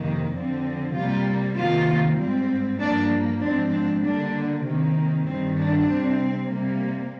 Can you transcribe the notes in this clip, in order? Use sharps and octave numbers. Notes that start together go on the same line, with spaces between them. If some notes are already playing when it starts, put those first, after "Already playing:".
Already playing: F2 C3 D#3 A#3
D3 F3 C4
C3 G3 A#3 F4
C3 D#3 A#3 F4
G#2 G3 C4
G2 F3 A#3 D4
G#2 F3 C4 D4
D4
D3 G3 A#3 D4
C3 D#3 A#3
G2 D#3 G3 C4
D4
C3 G3 C4
C3 G3 A#3